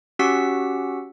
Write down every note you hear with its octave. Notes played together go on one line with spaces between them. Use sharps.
C#4 F#4 G4 F#5 E6 B6